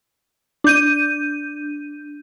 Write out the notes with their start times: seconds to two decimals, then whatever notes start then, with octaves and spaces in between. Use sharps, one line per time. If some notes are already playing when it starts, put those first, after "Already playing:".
0.64 D4 G6 D#7